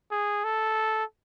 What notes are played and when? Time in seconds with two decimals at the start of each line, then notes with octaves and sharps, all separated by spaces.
0.11 G#4
0.44 A4